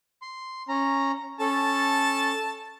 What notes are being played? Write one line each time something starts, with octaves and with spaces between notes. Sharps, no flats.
C6
C#4 A#5
C#4 A4 A5